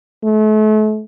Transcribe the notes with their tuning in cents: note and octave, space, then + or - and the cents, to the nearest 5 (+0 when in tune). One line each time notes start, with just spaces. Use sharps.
A3 -40